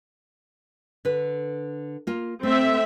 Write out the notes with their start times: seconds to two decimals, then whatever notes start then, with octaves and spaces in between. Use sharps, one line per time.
1.05 D3 B4
2.07 A#3 F4
2.43 A3 C4 E5